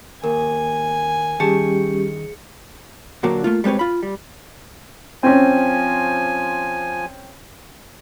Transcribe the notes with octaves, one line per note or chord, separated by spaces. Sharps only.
D#2 A#4 G#5
D#3 G3 C#4 G4 G#4 A5 C#7
A#2 D3 F#3 A#3 D4 F#4
A3 A#3 F4
G3 G#3 C4 B4 C#5
F4 B5
G3
F3 C4 C#4 G#5